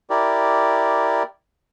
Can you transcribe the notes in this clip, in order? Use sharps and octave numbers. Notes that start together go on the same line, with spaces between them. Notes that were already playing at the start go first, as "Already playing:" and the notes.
E4 G4 A#4 D5